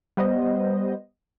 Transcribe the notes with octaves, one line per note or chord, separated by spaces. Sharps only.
G3 B3 C5 D#5